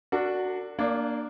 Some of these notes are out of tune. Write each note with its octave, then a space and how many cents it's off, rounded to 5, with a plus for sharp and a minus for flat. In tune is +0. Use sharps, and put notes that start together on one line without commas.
D4 +0 F#4 +0 A#4 -45
A#3 +0 D4 +10 D5 -30